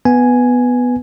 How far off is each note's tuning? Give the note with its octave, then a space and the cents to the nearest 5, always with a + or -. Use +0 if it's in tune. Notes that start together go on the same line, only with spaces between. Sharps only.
B3 +0 G#5 +0